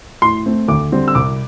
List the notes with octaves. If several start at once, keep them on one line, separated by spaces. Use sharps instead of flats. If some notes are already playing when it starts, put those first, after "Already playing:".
A2 C6
A3 C4
D2 D6
D3 G3 C4
E6
C2 D6